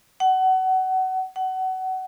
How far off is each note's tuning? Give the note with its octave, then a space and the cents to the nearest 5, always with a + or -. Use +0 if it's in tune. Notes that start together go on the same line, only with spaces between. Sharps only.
F#5 +25
F#5 +25